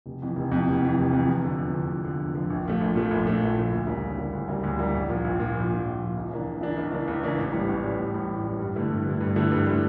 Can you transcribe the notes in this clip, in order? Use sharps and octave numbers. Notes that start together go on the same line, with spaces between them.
F1
F2 E3
F1
F2 E3
F1
F2 E3
F1
F2 E3
E2
D3 F3
E2
D3 F3
E2
D3 F3
E2
D3 F3
A#1
A#2 F3 A3
A#1
A#2 F3 A3
A#1
A#2 F3 A3
A#1
A#2 F3 A3
D2
C#3 G3 A#3
D2
C#3 G3 A#3
D2
C#3 G3 A#3
D2
C#3 G3 A#3
A#1
A#2 F3
A#1
A#2 F3
A#1
A#2 F3
A#1
A#2 F3
C#2
C#3 E3 A#3 D4
C#2
C#3 E3 A#3 D4
C#2
C#3 E3 A#3 D4
C#2
C#3 E3 A#3 D4
A1
A2 E3 G3
A1
A2 E3 G3
A1
A2 E3 G3
A1
A2 E3 G3
G2
D3 A3 E4
G2
D3 A3 E4
G2
D3 A3 E4
G2
D3 A3 E4